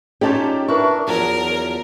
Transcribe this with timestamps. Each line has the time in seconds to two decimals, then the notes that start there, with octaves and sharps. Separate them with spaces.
0.21 C#4 D#4 F4 G4 D5 A5
0.68 D4 E4 A#4 B4 C#6
1.07 E2 F3 F#3 A#4